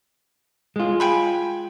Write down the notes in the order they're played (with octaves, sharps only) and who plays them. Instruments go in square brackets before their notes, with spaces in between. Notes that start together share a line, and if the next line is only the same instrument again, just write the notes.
[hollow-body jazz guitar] G#3 F4
[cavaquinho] G5 G#5 B5